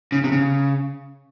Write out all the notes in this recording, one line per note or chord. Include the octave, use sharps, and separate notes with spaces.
C#3
C3
C#3